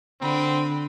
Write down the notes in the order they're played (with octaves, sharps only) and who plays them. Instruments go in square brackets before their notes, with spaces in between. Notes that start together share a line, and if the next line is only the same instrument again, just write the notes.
[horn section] A#2 B5 [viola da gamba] D3 [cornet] C4